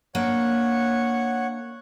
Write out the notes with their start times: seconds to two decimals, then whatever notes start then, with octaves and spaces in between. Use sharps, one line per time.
0.15 A#3 D4 C#5 F#5